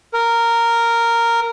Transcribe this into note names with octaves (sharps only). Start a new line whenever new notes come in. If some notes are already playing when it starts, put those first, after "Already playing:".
A#4